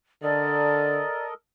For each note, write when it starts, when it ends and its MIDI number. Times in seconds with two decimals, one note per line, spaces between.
0.23 1.01 50
0.23 1.34 69
0.23 1.34 70
0.23 1.26 74
0.23 1.34 75